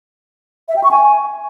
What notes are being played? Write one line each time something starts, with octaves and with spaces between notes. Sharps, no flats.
E5
G5
C#6
G#5